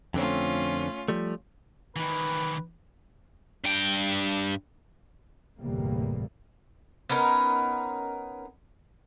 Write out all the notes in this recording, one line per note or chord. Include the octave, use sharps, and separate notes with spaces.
F2 D3 A3 C4 C#4 F4
F3 G3 A3
D#3 E3 B4
G2 G5
G1 E2 A2 C3 G3 A#3
B3 C#4 D#4 A#4